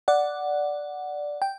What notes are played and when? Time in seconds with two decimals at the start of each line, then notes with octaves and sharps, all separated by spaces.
0.08 D5 F#5
1.42 G5